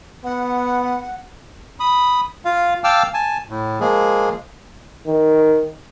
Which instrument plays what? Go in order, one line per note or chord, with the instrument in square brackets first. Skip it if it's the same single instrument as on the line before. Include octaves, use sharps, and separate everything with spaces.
[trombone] B3 [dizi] F#5
[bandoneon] B5 D#6
F4 F5
F5 G5 A5 D6 E6 F6
G#5 A5
A2
F3 G#3 A#3 G#4
[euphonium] D#3